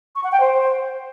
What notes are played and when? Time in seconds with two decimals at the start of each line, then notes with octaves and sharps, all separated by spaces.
0.15 C#6
0.24 F#5
0.32 G5
0.40 C5